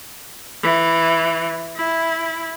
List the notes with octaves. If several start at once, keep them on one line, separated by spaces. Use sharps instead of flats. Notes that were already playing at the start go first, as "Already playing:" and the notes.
E3
E4